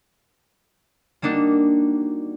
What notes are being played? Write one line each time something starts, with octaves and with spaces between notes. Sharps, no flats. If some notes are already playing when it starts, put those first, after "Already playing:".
G3 A#3 D4 D#4 F#4